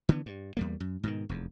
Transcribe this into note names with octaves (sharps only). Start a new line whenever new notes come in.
D3 E3 B3
G2
E2 G3 A#3
F#2
G#2 B2 D#3
F1 E2